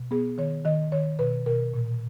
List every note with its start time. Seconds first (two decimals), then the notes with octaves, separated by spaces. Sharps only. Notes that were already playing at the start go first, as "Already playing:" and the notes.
Already playing: B2
0.11 B3 G#4
0.38 D#3 C#5
0.65 D#3 D#5
0.92 D#3 C#5
1.19 B2 B4
1.46 B2 A#4
1.74 A#2